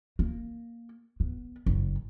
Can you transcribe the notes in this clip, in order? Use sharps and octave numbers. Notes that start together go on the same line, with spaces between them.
A#3
B3
F#1